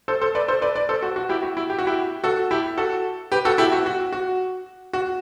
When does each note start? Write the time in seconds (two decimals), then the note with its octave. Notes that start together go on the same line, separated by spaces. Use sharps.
0.08 A4 C5
0.21 A4 C5
0.35 B4 D5
0.48 A4 C5
0.62 B4 D5
0.75 B4 D5
0.89 A4 C5
1.02 F#4
1.16 F#4
1.29 E4 G4
1.42 F#4
1.57 E4
1.70 G4
1.79 F#4
1.87 E4 G4
2.24 F#4 A4
2.51 E4 G4
2.78 F#4 A4
3.32 G4 B4
3.45 F#4 A4
3.58 E4 G4
3.72 F#4
3.86 F#4
4.12 F#4
4.93 F#4